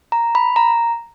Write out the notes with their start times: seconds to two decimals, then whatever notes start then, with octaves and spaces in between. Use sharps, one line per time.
0.12 A#5
0.35 B5
0.56 A#5